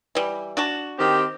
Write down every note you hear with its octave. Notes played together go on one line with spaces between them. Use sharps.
E3 G3
D4 F#4 A5
D#3 C4 G4